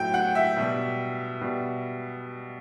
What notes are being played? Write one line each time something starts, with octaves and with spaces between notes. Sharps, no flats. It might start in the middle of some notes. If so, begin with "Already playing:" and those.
Already playing: A2 F#3 G5
F#5
E5
B2 G3
B2 G3